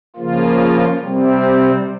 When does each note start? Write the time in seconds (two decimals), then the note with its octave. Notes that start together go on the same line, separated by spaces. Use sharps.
0.16 C#3 F3 A#3 F4
1.02 C3 G3 C4